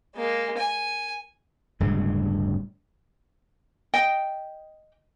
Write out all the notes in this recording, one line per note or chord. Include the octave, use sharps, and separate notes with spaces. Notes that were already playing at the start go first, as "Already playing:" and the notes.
G#3 A#3
G#5
D1 G2 C#3 G#3
D#5 G5